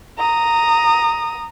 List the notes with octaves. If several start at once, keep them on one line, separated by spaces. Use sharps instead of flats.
A#5 D#6